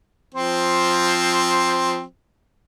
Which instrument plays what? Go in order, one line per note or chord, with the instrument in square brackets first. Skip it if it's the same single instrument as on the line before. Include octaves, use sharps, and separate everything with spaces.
[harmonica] F3 C4 C5